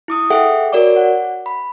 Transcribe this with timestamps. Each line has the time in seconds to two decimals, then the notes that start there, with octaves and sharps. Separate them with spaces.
0.08 E4 D6 D#6
0.30 G#4 A4 E5 F#5 G5
0.72 F#4 A#4 C#5 D5 D6
0.96 F#5
1.46 B5